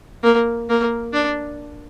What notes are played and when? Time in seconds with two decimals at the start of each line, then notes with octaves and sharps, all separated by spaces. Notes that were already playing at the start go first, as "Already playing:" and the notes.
0.23 A#3
0.69 A#3
1.14 D4